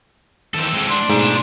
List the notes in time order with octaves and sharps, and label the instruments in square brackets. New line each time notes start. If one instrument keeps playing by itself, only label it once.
[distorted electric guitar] D#3 E3 [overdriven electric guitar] C4 A4
[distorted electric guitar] G#3 E4
[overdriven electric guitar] D4 [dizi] C6
[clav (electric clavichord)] G#2 [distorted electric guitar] B2 A3